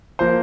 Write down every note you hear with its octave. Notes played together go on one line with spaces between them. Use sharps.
F3 A#3 C5